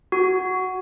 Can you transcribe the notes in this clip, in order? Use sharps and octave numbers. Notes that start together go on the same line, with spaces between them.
F#4